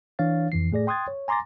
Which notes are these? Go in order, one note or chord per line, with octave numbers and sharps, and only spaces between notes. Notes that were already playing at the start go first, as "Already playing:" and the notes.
E3 D4 C#5 F5 A6
F2 E3 C7
A2 A3 G#4 D5 A#6
G5 C6 D#6 F#6 G#6 A6
C#5
G#5 A#5 C6 D6 A6 A#6